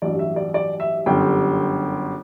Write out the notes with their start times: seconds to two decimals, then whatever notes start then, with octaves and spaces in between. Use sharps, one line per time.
0.02 A1 G2 F#3 D5
0.19 E5
0.36 D5
0.54 D5
0.80 E5
1.06 G1 F#2 D3 G3 G5